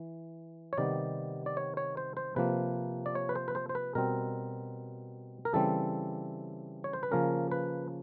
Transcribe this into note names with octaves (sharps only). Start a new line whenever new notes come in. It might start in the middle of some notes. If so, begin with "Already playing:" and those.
Already playing: E3
C#5
C3 D#3 G3 B3 D5
D5
C#5
C#5
C5
C5
C3 F3 A#3 B4
D5
C#5
B4
C5
B4
C5
C5
B4
B2 G3 C4 A#4
A#4
C#3 E3 G3 C4 A4
C#5
C5
B4
C#3 F3 A#3 C#4 A#4
B4